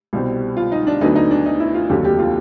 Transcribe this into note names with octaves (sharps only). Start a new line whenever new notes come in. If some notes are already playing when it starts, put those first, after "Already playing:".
C2 B2 G3 C4
F4
D#4
D4
D2 D3 F#3 B3 D4 D#4
D#4
D4
D#4
E4
F4
F1 D#2 D3 F#3 G4
G4
F4